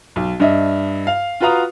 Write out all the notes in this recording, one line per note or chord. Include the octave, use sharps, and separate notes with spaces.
B1
G2 D4 D#5 E5
F5
F4 F#4 B4 F5 A#5 D#6